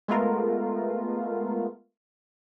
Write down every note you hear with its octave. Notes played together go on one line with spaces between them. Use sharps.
G#3 A3 B3 F4 A#4